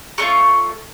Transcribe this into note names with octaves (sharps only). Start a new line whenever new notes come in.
A3 C#4 F4 C#6